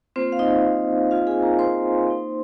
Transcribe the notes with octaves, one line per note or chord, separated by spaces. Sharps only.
A#3 C4 F4 C5
F5
D#4 D#5
F4 F5
G#4 G#5
A#4 A#5
C5 C6
A#3 D#4